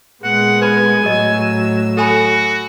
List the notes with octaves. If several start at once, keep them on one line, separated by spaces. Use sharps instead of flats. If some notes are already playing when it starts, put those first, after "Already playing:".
A#2 G#3 B3 F#5
B4 G#5 B5
A2 F#3 D#5 E6
F#4 A4 G#5 B5